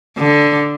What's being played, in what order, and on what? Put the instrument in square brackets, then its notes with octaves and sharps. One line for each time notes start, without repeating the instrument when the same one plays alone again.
[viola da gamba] D3